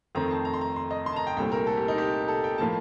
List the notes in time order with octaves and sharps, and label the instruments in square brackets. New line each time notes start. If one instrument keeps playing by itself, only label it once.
[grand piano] F2 D#3 A3 C4 A#5
A5
A#5
C6
A#5
C6
D#5
C6
A5
A#5
G5
C2 A#2 A3 C4 G5
A#4
A4
G4
D#4
G4
A4
G5
A2 F3 A#3 A5